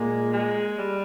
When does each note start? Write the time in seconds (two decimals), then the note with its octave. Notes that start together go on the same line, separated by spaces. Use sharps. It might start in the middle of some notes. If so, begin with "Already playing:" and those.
Already playing: A#2 G#3 A#3
0.33 G#3
0.78 G3